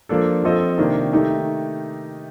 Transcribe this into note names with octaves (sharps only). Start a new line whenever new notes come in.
F3 A#3 D4 A4
F3 C4 F4 A4 D#5
C3 D#3 A#3 D4
D#3 A3 D#4 G4